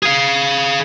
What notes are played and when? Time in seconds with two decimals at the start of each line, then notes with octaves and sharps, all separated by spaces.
0.03 G#4 F5